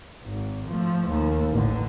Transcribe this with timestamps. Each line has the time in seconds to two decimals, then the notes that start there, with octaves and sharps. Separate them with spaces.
0.24 G#1
0.67 F3 A3
1.09 D#2
1.51 A1 D3